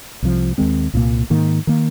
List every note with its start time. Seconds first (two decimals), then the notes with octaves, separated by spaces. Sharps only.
0.23 C2 C3 F3
0.58 D#2 D#3 G#3 C4
0.94 C2 A#2 A#3
1.30 G#2 D#3 A#3
1.67 D#3 A#3